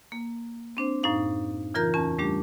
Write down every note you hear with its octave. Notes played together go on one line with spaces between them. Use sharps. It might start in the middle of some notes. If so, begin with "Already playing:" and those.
A#3
C4 D4 C5
F#2 A2 D#4 F5
C#3 E3 F4 A#4 A#5 G6
E2 C#4 A5
G3 A3 D4 G4